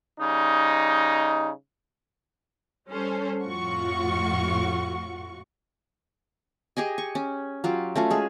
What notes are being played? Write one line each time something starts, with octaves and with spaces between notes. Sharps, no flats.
C#3 G3 D#4
G3 C#4 A4 C5
F2 A2 F4 F#4 C#6
G4 G#4 D#5 G#5
C#6
C#4
F#3 F4 G4
A3 C#4 F4 F#4
G#3 G#4